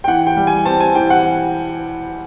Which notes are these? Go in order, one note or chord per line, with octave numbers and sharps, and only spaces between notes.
G5
E3 F#5
G5
G3
G#5
C4 A5
G#5
E3 G5
F#5